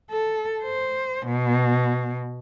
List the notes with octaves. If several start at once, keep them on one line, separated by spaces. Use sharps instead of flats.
A4
C5
B2